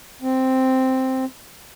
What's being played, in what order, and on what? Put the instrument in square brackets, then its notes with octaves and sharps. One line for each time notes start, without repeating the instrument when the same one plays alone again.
[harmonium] C4